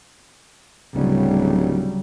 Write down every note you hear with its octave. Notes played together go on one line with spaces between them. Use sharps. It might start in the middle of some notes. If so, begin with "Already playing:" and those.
D1 C#3 F#3 G3